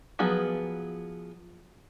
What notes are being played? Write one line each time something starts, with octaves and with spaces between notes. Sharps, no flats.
F3 F#3 B3 G#4